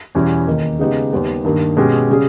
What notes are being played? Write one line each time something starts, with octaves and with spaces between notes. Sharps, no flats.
E2 B2 G3 C#4 E4
D#2 D#3 A#3 D#4
C#3 G#3 B3 D#4 G4
D#2 D#3 G3 B3
G2 D#3 A#3
B2 G#3 C#4 G4
C#3 G3 C#4 G#4